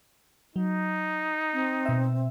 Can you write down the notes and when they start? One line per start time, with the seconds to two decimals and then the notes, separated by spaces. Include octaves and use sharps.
0.56 F#3 D#4
1.53 C4
1.86 B2 E5